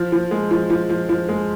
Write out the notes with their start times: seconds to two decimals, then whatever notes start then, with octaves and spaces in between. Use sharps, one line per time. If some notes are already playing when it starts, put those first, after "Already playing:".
Already playing: F3
0.12 F3
0.31 G#3
0.51 F3
0.70 F3
0.90 F3
1.09 F3
1.29 G#3